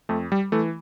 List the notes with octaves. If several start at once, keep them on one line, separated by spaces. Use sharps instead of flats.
F2 A3
G3
E3 A3